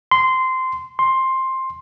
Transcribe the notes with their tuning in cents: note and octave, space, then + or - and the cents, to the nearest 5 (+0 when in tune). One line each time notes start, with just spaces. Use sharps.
C6 -15
C6 +10